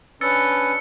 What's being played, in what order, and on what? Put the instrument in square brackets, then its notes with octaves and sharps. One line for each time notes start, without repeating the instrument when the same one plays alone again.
[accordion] C#4 D4 B4 [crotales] E6 A6 C#7